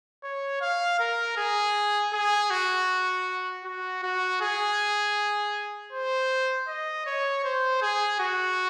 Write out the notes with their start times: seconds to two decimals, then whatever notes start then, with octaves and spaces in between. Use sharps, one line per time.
0.24 C#5
0.61 F5
0.99 A#4
1.37 G#4
2.13 G#4
2.51 F#4
3.64 F#4
4.03 F#4
4.41 G#4
5.92 C5
6.68 D#5
7.06 C#5
7.44 C5
7.82 G#4
8.20 F#4